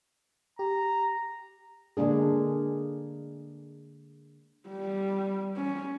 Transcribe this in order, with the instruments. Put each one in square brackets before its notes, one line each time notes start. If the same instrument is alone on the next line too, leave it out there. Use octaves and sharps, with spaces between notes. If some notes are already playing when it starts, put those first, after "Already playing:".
[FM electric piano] G4 [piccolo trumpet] A#5
[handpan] D3 G#3 A#3 D4 G#4
[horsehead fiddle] G3
C#4